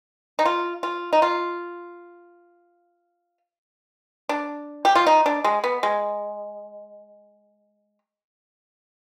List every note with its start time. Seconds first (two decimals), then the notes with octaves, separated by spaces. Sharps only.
0.39 D#4
0.45 F4
0.83 F4
1.13 D#4
1.22 F4
4.29 D4
4.85 G4
4.95 F4
5.07 D#4
5.26 D4
5.44 G#3
5.64 B3
5.83 G#3